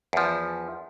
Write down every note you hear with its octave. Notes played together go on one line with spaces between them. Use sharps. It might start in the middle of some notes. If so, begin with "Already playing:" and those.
E2 F3